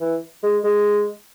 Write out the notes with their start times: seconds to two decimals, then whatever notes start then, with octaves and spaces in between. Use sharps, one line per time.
0.01 E3
0.43 G#3
0.64 G#3